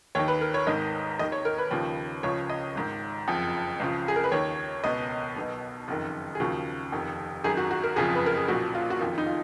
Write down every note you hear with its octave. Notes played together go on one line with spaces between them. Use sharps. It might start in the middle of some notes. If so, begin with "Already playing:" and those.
D#2 D#3 C#5
B4
A#4
C#5
G#1 G#2 D#3 D#5
D#2 D#3 D#5
C#5
A#4
B4
D#2 C#3 F3
C#2 C#3 F3 C#5
D#5
G#1 G#2 D#3
F#1 F2 F3
C#2 C#3 F3
G#4
A#4
B4
D#2 D#3 C#5
C#2 B2 D#5
B1 B2
F#1 F2 D#3
G#4
D#2 C#3 F3 F#4
F1 F2 D#3
G#1 F#2 D#3 G#4
F#4
F#4
A#4
F#1 F2 C#3 F3 G#4
B4
A#4
G#4
B1 A#2 F3 F#4
F4
F#4
F#1 F2 D#3 F4
D#4
F4